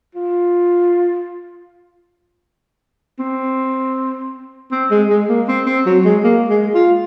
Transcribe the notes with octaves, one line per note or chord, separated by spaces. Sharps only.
F4
C4
C4
G#3
G#3
A#3
C4
C4
F#3
G#3
A#3
G#3
F4